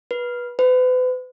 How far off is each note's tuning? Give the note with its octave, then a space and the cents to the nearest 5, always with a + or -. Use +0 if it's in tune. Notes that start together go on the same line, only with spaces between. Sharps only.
B4 -20
B4 +40